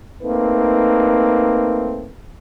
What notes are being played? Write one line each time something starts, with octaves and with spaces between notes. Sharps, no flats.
A3 A#3 C4 D#4 B4